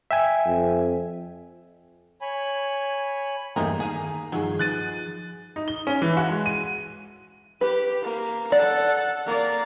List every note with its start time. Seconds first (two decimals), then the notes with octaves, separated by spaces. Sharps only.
0.11 E5 G5 G#5
0.46 F2
2.21 C#5 G#5 B5
3.56 E2 G2 G3 A3 A#3 D#4 G#4 A#5
3.80 D#3 G#4 F5
4.32 G2 D#3 F3 F#3 D#4 G#4
4.59 F3 F#6 A6 D#7
5.56 D#4
5.68 G7
5.87 C#4
6.02 E3
6.17 F#4
6.29 G#3
6.46 D#7
7.61 G4 B4
8.02 A#3
8.52 A4 D5 F#5
9.26 A#3 D5